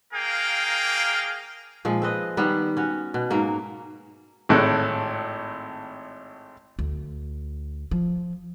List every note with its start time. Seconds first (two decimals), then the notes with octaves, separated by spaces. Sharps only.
0.13 A#3 G#4 A#4 F5 G5
1.85 A#2 F3 G#3
2.02 C4 B4 D#5
2.37 D#3 G3 B3
2.77 C#4 F#4
3.14 B2
3.30 G#2 F#3 A#3
4.49 G#1 A2 A4 F#6
6.79 D2
7.91 F3